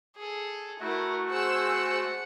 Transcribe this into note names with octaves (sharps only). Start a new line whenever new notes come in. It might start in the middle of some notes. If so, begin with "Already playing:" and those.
G#4 A4
A3 E4 F#4 A#4
G#4 C5 F#5 E6